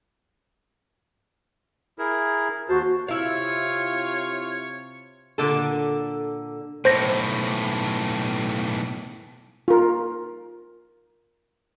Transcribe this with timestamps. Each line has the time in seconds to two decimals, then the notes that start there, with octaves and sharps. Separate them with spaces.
1.99 E4 G#4 A#4
2.69 D#2 F#4 C5 A5
3.08 C3 E4 F4 C#5 F5
5.38 A#2 D3 A4
6.85 B1 A2 C5 A#6
9.68 F4 A#4